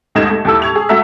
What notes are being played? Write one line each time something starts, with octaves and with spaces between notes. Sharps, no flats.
D#2 G#2 A3 D#4 G#6 E7
A3
D#2 E4 A4 E6
A5 C#6 G#6 F7
G#4
A3 F#4 E5 A#5 E6 B6